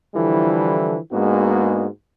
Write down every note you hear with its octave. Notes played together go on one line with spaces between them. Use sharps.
D3 E3 F3 G3 E4 A4
G#2 G#3 A#3 B3 D4 F#4